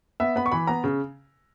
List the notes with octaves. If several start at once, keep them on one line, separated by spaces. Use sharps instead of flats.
B3 E5
B3 B5
C#6
E3 B5
B3 A#5
C#3